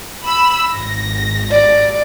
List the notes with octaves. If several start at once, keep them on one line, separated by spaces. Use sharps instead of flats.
B5 E6
G#1 A#6
D5